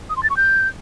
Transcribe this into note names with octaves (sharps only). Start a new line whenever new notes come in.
D#6
C6
A6
C#6
G6